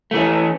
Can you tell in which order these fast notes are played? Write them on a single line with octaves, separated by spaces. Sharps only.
A3 E3 C#4